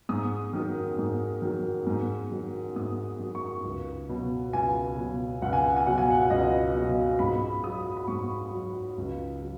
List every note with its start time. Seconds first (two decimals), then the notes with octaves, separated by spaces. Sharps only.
0.09 G#2 D#6
0.53 D#3 F#3
0.98 G#2
1.42 D#3 F#3
1.87 G#2
2.32 D#3 F#3
2.76 G#2 D#6
3.19 D#3 F#3
3.35 C#6
3.64 C#2
4.09 B2 F#3
4.53 C#2 G#5
4.97 B2 F#3
5.42 C#2 F#5
5.53 G#5
5.64 F#5
5.76 G#5
5.86 B2 F#3 F#5
5.98 G#5
6.10 F#5
6.21 F#5
6.30 C#2 D#5
6.75 B2 F#3
7.19 G#2 B5
7.64 F#3 D#6
7.97 B5
8.08 G#2 C#6
8.53 F#3
8.98 C#2
9.41 F#3